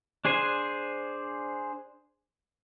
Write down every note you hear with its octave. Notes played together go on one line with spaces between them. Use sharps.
D4 G#4 C5 G#5